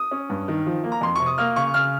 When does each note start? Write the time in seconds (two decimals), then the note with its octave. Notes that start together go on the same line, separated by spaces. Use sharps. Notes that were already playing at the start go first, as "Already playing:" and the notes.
Already playing: D#6
0.11 C#4
0.30 G2
0.48 D#3
0.66 F3
0.84 A#3
0.92 A#5
1.01 F2 C6
1.16 C3 C#6
1.26 D#6
1.38 A#3 F6
1.56 C#3 C#6
1.74 C#3 F6